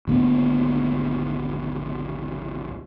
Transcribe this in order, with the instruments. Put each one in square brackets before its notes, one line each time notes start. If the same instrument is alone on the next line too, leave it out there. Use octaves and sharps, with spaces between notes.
[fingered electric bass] G#1 D2 A#3 B3